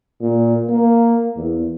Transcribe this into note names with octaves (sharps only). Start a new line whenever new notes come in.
A#2
A#3
E2